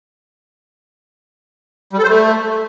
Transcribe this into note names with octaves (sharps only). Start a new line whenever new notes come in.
G3
A4
C5
A3